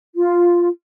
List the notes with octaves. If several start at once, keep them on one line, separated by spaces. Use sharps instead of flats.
F4